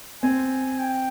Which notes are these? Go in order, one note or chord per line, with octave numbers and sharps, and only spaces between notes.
C4 G#5
G5